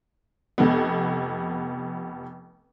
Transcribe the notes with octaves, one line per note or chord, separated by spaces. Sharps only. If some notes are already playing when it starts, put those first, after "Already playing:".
F1 B3